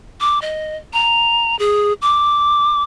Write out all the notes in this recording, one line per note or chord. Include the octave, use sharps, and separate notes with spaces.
D6
D#5
A#5
G#4
D6